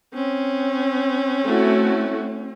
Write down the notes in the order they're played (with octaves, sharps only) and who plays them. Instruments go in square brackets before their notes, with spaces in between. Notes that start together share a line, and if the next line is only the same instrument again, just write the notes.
[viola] C4 C#4
[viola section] A3 E4 F#4